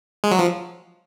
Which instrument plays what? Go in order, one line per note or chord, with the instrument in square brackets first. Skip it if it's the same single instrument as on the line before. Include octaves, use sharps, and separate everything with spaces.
[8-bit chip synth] G#3
F#3
F3